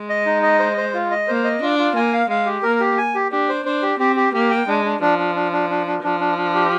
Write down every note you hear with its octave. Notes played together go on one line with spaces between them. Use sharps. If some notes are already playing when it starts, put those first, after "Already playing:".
Already playing: G#3
D#5
D#4
D#5
C5
C5
F4
D#5
A#3 C5
D#5
D4 F4
F4
A#3 G#5
F5
G#3 F5
G4
A#3 A#4
G4
G#5
G4
D4 G4
C5
D4 C5
G4
C4 G4
G4
A#3 G4
G5
G#3 D4
D4
F3 D4
D4
D4
D4
D4
D4
F3 D4
D4
D4
G4